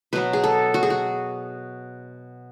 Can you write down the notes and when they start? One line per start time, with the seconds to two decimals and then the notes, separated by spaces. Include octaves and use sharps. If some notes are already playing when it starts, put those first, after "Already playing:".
0.13 B2 F#3 B3 B4
0.33 G#4
0.44 A4
0.74 F#4
0.83 G#4
0.90 F#4